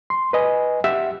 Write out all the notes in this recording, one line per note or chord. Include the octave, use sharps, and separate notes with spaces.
C6
B4 D#5 G#5
G4 E5 F#5